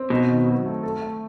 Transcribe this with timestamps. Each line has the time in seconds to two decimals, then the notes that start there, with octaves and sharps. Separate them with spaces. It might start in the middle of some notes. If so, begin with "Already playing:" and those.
Already playing: C4
0.10 B2 D#4
0.29 D#3
0.47 F#3
0.66 A3
0.83 A4
1.02 A3